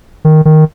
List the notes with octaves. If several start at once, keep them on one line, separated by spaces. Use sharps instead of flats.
D#3
D#3